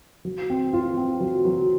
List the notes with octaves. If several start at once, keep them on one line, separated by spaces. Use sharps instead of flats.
F#3
C4
F4
C4
F#3
F#3